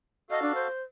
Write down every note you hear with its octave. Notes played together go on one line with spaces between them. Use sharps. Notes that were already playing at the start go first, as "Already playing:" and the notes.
F#4 A4 D#5 F5
D4
C5